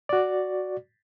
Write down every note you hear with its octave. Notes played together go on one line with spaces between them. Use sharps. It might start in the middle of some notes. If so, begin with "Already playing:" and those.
F#4 D5